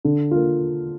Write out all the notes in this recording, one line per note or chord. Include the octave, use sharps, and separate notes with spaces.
D3
A#3 F4